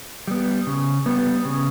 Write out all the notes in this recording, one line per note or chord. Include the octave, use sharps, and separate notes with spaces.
G3 B3
C#3
G3 B3
C#3